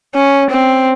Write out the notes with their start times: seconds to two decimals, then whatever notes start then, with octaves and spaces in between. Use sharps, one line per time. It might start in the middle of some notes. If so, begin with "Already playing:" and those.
0.15 C#4
0.51 C4